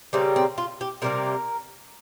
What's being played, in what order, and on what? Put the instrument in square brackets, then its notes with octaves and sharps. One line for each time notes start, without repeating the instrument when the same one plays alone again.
[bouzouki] C#3 G3 A#3 C4
C4
F4
G4
C3 G3 A#3 A#4